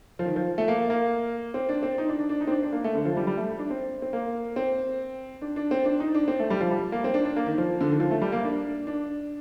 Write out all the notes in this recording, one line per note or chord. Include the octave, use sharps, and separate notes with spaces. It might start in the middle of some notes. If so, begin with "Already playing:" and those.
F3
D#3
F3
A3
A#3
A#3
C4
D4
C4
D#4
D4
D4
D4
D#4
C4
D4
D4
A#3
A3
D3
F3
G3
G3
A3
D4
C4
C4
A#3
C4
D4
D4
C4
D4
D#4
D4
C4
A3
G3
F3
G3
A#3
C4
D4
D4
A#3
D#3
F3
D3
D#3
F3
A3
G3
A#3
D4
D4